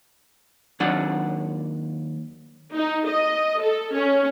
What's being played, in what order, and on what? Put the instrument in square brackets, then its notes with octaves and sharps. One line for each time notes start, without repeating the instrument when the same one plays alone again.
[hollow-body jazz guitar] D#2 F#3 D4 D5 F#5
[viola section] D#4
D#5
A4
C#4